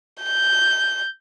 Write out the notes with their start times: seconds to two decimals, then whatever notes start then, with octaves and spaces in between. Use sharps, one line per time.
0.23 G6